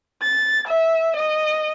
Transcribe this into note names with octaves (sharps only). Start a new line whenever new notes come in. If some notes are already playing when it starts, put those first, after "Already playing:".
A6
E5
D#5